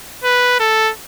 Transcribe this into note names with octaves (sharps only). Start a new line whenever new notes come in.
B4
A4